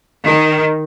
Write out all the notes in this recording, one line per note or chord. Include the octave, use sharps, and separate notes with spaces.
D#3